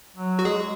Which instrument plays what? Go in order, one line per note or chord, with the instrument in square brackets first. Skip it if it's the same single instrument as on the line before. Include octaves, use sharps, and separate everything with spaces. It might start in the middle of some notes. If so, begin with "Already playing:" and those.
[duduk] F#3
[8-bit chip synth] F#4
[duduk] G#3 [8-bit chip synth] G#4